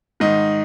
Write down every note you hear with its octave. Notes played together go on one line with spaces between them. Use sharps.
G#2 D#3 D#4